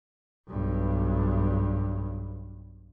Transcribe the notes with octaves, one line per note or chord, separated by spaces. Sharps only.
B1 G2